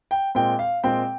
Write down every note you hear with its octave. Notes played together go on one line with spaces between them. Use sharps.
G5
A#2 G#3 C4 G5
F5
A#2 G#3 C4 G5